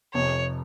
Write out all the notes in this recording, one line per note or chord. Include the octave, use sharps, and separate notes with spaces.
F1 F2 C3 C#5